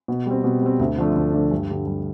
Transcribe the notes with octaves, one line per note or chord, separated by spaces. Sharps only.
B2
G3 C4
B2
G3 C4
D2
D3 F3 A3 D4
D2
D3 F3 A3 D4
G2
D3 G3
G2